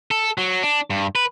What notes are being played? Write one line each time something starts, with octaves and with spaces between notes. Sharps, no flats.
A4
F#3
D4
G2
B4